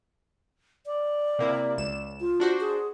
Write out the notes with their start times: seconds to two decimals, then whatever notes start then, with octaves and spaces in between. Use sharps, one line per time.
0.86 D5
1.39 C3 A#3 E4
1.78 C#2 E7
2.20 F4
2.40 D4 F#4 C5
2.60 G#4